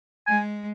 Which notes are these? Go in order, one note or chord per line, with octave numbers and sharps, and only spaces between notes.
G#3 G#5